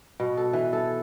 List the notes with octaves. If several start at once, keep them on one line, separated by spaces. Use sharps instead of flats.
B2
A4
E3
A4